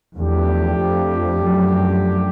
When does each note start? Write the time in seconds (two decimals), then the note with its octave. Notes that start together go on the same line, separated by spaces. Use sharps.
0.17 E2 F3 A3 D4 G4
0.81 F2
1.45 F#2